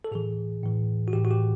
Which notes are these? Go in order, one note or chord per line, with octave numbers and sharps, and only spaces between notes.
A4
A2 E3 G#4
A2 E3
F#4
A2 E3 G4
F#4
G4